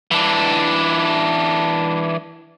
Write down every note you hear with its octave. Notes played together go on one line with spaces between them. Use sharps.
E3 D4